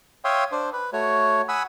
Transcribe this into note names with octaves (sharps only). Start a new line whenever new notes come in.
C#5 E5 F5 G5 C6 D#6
D4 C5
B4
A3 F#4 C#5
F#5 G#5 B5 D#6 E6